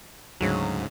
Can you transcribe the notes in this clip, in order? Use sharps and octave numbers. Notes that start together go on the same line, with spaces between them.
D2 G#2 C#3 F#3